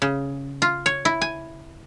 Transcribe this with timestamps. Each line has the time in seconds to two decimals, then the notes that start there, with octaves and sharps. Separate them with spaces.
0.02 C#3
0.62 F4
0.86 C#5
1.05 E4
1.21 G#5